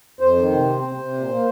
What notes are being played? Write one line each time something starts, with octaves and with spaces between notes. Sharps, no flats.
F2 C5
D#3
C3
C4
C3
C3
A#2
A#3